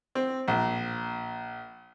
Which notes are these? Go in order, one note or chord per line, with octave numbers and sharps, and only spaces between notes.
C4
A#1